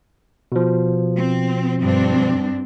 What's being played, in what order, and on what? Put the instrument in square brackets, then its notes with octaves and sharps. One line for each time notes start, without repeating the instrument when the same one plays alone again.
[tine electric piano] B2 F3
[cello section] C4
G2 C4 D4